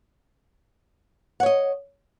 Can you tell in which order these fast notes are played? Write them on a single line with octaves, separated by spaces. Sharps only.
F#5 C#5 D#5